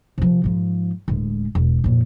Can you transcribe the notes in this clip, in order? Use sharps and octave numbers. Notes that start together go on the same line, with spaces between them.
C3 F3
G#2 F3
D1 G#3
E1
F2 A#2